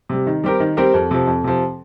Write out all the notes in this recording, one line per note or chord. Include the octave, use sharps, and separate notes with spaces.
C3 G3
D#3
G3 C4 G4 A#4
D#3
G3 C4 G4 A#4
F2
C3 F3
F2
C3 F3